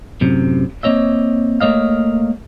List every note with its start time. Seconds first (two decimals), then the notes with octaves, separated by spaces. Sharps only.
0.21 F#2 A2 C3
0.83 A#3 C4 C#5 D#5 E5
1.61 A3 A#3 C#5 D#5 F5